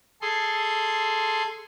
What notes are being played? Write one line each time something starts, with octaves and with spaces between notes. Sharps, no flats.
G#4 A4 C6